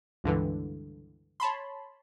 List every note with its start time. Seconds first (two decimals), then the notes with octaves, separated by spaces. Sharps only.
0.24 C#2 G2 D3 E3
1.40 C#5 A5 B5 C6